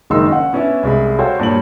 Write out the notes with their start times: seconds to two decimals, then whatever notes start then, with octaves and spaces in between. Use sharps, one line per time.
0.10 F#1 G#2 D#3 D#4 C6 E6
0.30 C#4 F#5
0.53 B3 C#4 D4 E4
0.83 C2 G#3 B5
1.19 F#4 A4 C5 C#5 F5 G5
1.39 G2 A#2 C#5 F#7